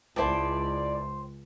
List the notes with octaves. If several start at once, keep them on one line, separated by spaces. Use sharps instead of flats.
C#2 E4 C5 D5 G5 A5